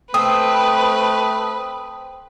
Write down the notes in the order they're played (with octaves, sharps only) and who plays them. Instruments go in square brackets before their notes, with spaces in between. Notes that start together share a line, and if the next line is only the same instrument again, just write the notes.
[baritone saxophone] A3 [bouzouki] C4 [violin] B4 [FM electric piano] D#6